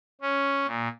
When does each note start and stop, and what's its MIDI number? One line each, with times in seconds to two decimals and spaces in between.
0.21 0.66 61
0.67 0.88 46